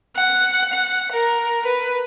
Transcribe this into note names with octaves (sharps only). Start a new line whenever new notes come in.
F#5
F#5
A#4
B4